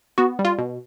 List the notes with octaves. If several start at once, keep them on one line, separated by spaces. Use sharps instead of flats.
B3 F#4
G3
F4
B2